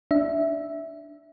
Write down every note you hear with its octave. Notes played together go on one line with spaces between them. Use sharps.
D4 E5